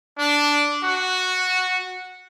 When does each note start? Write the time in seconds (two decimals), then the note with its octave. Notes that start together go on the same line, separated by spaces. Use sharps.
0.18 D4
0.84 F#4